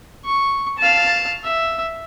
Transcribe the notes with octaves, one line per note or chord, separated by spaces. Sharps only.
C#6
F5 A5
E5